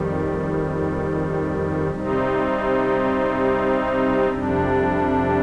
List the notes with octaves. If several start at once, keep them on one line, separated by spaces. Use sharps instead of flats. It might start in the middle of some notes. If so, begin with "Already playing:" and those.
Already playing: F2 D#3 G3
C3 G3 C4 D#4
F2 C3 G3 D4